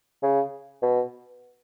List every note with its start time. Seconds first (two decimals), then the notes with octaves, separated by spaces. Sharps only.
0.23 C#3
0.82 B2